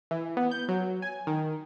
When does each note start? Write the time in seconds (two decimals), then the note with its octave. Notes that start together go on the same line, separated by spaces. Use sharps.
0.11 E3
0.37 B3
0.51 G6
0.68 F#3
1.02 G#5
1.27 D#3